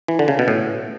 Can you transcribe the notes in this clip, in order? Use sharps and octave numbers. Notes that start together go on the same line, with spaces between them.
E3
D3
C#3
B2
A2